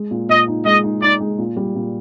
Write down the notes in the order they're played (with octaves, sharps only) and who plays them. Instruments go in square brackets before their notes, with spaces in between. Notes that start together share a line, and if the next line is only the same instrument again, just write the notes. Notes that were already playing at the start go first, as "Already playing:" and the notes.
Already playing: [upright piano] G#3
A#2
[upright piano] A#2 [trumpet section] D#5
[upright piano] D#4
[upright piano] G#3 [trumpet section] D#5
[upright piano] D#4
[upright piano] D#4 [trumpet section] D5
[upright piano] G#3
A#2
G3
A#2